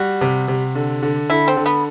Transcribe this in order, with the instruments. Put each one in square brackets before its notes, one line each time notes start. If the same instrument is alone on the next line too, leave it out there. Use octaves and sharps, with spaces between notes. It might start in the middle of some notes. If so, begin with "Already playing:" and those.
Already playing: [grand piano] G3 [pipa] F#4
[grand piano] C3
C3
D3
D3
[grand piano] D3 [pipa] E4
[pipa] C4
[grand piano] D3
[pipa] B3